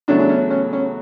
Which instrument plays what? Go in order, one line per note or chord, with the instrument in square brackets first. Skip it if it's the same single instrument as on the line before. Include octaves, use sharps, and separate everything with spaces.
[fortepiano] E2 C#3 F#3 A3 D4
D4
C#4
C#4
C#4